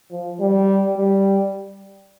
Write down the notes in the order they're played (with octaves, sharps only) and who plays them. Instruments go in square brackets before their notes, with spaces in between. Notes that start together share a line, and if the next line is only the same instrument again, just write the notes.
[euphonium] F3
G3
G3